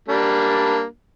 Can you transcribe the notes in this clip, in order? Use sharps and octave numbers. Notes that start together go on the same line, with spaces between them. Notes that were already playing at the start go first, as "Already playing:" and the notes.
G3 A#3 D4